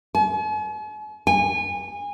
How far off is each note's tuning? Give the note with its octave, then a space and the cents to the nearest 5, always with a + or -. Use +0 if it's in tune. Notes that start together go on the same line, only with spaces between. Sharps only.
G#5 +45
G#5 -25